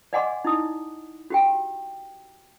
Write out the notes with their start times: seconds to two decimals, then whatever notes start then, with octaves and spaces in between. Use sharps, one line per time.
0.13 D5 D#5 F#5 G#5 C6 D6
0.45 D#4 E4 D#6
1.30 F#4 G4 G5